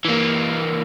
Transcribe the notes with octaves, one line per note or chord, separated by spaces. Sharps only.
E3 A#3